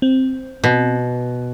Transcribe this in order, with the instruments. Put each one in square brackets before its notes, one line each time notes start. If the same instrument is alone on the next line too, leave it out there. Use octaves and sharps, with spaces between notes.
[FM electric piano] C4
[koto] B2